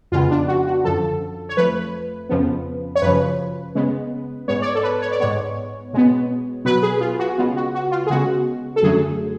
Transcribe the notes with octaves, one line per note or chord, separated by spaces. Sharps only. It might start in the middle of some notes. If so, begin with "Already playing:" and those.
F2 C#3 G#3 B3 F4
D4
F#4
F#4
F#2 D3 F3 A4
C#5
F2 F3 A3 B4
F2 C#3 F3 B3
C#5
F#2 C#3 F3 B4
C#3 G#3 B3
G#2 G#3 B3 C#5
D5
C#5
A4
B4
C#5
D5
G#2 G#3 B3 C#5
B2 G#3 B3
B2 F#3 B3 B4
G#4
F4
F#4
C#3 G#3 B3 F4
F#4
F#4
F4
G#4
C#3 G#3 B3 F#4
A4
F#2 D3 F#3 A3 G#4